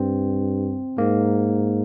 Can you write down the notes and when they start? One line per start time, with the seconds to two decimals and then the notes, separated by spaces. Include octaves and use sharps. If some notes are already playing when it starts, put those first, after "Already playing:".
Already playing: G2 C4
0.98 G#2 A#3